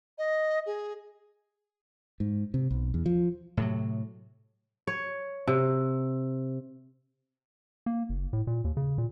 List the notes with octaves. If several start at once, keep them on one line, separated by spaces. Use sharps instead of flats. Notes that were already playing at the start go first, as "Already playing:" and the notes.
D#5
G#4
G#2
C3
B1
E2
F3
A2 C3 F#3
C#5
C3
A#3
F#1
A2
A#2
D#2
C#3
A#2